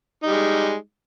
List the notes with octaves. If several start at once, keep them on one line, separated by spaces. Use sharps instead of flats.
G3 G#3 D#4